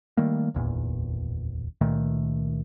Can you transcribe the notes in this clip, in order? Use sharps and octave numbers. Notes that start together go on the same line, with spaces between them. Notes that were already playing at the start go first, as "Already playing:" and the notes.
D#3 G3 A3 A#3
D1 G#1 E2 A#2
C#2 A#2 D#3 A3